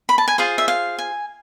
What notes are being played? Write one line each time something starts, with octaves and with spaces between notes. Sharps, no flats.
B5
A5
G#5
F4 G#4 C5 F5
E5
F5
G#5